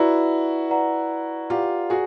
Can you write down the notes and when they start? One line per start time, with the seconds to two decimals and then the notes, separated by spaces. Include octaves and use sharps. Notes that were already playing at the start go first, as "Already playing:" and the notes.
Already playing: E4 F#4 B4 D5 F#5 A#5
0.70 B4 D5 F#5 A#5
1.50 F4 G4 B4 D5 F#5 A#5
1.90 F#4 G#4